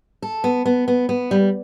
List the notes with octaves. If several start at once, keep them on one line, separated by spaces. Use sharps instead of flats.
A4
B3
B3
B3
B3
G3